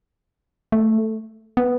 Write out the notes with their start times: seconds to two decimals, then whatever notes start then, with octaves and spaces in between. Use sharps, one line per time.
0.72 A3
1.57 B3